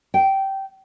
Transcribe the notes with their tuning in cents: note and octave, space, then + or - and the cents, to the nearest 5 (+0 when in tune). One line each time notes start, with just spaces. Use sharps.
G5 -15